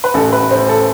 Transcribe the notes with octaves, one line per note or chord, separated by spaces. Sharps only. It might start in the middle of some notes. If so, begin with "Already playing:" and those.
B4
A1 A4
A2 B4
A2 C5
A4